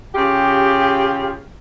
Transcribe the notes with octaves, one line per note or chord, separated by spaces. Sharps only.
C#3 F4 G4